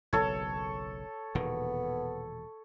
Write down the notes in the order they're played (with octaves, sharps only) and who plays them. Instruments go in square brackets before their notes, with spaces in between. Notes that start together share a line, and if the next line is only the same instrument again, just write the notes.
[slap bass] F#1 B1 [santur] A4 C#5
[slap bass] E1 A#2 D#3 [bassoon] B3